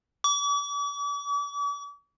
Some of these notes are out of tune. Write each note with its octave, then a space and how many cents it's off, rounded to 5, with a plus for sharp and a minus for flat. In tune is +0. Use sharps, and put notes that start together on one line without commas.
D6 -45